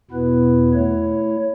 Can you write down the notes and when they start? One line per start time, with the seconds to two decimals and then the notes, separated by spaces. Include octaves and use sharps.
0.11 E2 B2 B3 E4 B4
0.73 A3 E4 C#5